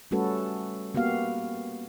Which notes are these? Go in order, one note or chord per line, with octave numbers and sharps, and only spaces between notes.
G3 A3 C#4 F#4 A4 B4
A#3 B3 F#4 G4 F5